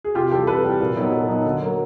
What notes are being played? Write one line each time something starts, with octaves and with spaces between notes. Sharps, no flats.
G#4
C3 F4 G4
E3 G3 G4 A4
C3 A4 B4
E3 G3
A#2
F#3 B3 D#4
A#2
F#3 B3 D#4
D3
F#3 A#3